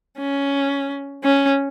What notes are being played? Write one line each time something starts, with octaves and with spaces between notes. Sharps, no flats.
C#4
C#4